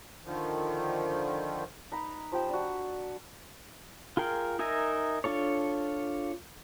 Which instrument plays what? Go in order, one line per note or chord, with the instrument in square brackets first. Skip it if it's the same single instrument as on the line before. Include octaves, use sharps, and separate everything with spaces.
[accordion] D3 D#3 F3
[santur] D#4 B4 A#5
F3 G4 G5 E6
D4 F#4
[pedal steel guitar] F4 G#4 A#4 G5
D#4 A#4 E5 G#5
D4 F4 A4 C#5